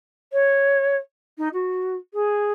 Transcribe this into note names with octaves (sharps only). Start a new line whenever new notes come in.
C#5
D#4
F#4
G#4